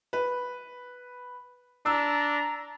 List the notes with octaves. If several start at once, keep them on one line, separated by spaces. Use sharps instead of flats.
B4
D4 A#5 E6